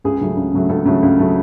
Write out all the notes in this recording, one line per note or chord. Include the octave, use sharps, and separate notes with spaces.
C#2 G#4
C#3 F#3 A3
C#2
C#3 F#3 A3
C#2 A4
C#3 F#3 A3
C#2
C#3 F#3 A3